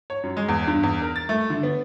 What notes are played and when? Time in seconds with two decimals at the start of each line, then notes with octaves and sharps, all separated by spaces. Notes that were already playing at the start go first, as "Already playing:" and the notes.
0.10 C#5
0.23 F#2
0.37 G#3
0.48 E2
0.67 G2
0.83 E2
1.02 A#4
1.16 A6
1.29 A3
1.50 D3
1.63 B3